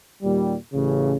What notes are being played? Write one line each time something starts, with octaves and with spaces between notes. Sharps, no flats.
D#2 A#2 G3
A1 C#3